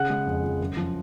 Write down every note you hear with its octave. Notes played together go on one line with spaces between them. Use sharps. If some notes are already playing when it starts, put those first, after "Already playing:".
Already playing: C#3 F#5 F#6
G#3
F2
F3
F#2
F3